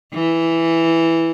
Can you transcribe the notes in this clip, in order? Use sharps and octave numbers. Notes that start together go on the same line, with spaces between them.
E3